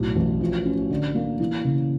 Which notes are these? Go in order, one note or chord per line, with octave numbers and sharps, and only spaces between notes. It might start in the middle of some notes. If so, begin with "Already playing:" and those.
Already playing: B1 A2
A1
F3
C#4
D3
A#3
E3
C#3